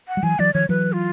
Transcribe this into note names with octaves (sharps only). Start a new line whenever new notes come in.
F#5
G3
E3 F#3 G#5
E3 F#3 D5
D#3 F3 C#5
E3 F#3 B4
F4